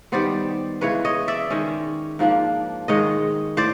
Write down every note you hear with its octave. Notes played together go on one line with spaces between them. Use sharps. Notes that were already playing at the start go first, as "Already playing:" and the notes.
D#3 G3 B3 C5 D5
C#3 E3 G#3 B4 C#5
C#5 D#5
D5 E5
D#3 G#3 C#4
G#2 F3 A#3 D4
G#2 D#3 G#3 C#5 D#5
A2 C5 D5